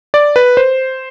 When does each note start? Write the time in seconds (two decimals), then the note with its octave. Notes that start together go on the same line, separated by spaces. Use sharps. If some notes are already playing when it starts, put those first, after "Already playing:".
0.14 D5
0.36 B4
0.57 C5